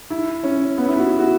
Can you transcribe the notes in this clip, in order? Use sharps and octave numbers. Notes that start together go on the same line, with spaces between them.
E4
C#4
B3
E4
F#4
E4
F#4